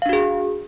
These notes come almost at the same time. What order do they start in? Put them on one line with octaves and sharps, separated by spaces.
F5 D4 F#4 G#4